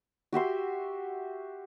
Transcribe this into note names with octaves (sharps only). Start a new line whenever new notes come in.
F#4 G4 E5 C6